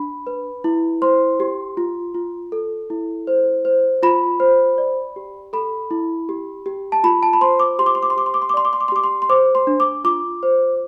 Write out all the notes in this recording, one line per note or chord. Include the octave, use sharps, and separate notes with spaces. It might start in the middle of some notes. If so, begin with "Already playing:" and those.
Already playing: D4 B5
B4
E4
C5 C6
G4
F4
F4
A4
E4
C5
C5
F4 B5
C5
D5
G4
A4 B5
E4
G4
G4
A5
F4 B5
A5
B5
C5 C6
D6
G4 C6
D6
C6
D6
C6
G4 D6
C6
D6
C6
D6
D5 C6
D6
C6
D6
C6
G4 D6
C6
C6
C5 D6
C6
D4
D6
F4 D6
C5